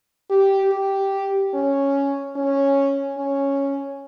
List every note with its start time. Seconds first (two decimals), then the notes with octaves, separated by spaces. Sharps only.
0.30 G4
0.71 G4
1.54 C#4
2.36 C#4
3.18 C#4